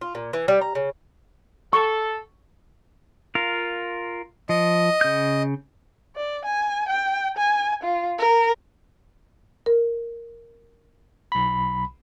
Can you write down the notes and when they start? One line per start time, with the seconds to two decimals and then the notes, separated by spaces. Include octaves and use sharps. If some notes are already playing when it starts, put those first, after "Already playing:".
0.01 F4
0.15 A#2
0.33 E3
0.48 G3
0.61 A#5
0.75 C#3
1.73 A4 C#6
3.35 F4 A#4 F5
4.49 F3 D#5
5.01 C#3 G6
6.16 D5
6.45 G#5
6.89 G5
7.37 G#5
7.84 F4
8.19 A#4
9.66 A#4
11.32 B1 B5